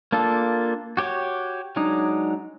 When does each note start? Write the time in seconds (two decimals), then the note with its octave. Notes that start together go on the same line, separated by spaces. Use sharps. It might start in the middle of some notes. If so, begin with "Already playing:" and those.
0.12 A#3 D4 F4 A4
0.97 F#4 G4 C#5 D6
1.76 F#3 G#3 D4 D#4